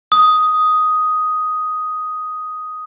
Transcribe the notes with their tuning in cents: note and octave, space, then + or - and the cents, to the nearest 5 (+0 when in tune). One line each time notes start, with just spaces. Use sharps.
D#6 +5